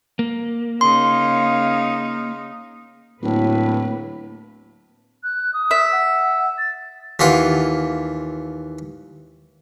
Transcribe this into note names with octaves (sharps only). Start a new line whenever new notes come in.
A#3
C#3 D#4 F5 C6
D1 A2 F#3 A#3 B4
F#6
D#6
E5
F#5
A6
D#2 E3 F4 F#5